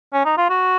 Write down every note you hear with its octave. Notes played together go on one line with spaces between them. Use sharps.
C#4
D#4
F4
F#4